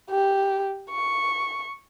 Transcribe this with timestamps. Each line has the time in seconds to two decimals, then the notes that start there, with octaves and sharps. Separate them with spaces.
0.10 G4
0.91 C#6